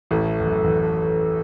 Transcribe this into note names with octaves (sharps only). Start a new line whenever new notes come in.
A1 A2 A4
E2
F#2
E2
A4